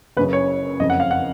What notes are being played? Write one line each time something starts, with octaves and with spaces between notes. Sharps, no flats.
F#1 F#2 C#3 B4
C#5
F#1 F2 C#3 D#5
F#5
F5
F#5